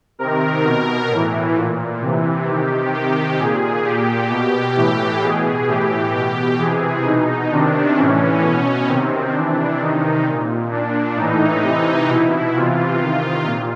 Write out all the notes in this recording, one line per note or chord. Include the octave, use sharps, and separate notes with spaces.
C3 D#3 A#4
B2
A2 E3
A#2
C3 E3
C3 D#3 G4
C3 D#3 G4
A#2 G#4
A#2 G4
B2
A2 E3 G4
B2 G#4
A2 E3 G4
B2
C3 E3 G#4
B2 D#4
C3 D#3 D4
A2 E3 C#4
B2
C3 D#3 C4
C3 E3 D4
C3 D#3 D#4
A#2
A#2 D4
A2 E3 D#4
C3 E3
B2 E4
C3 E3 F4
C3 D#3
A#2